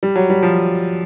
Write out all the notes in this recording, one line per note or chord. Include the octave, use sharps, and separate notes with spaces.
G3
F#3
G3
F3